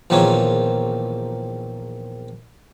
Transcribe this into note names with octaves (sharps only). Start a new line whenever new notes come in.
A#1 E2 D#3 F3 A#3 C#4